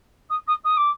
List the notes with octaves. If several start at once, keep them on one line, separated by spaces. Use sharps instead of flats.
D#6
D#6
D#6
D6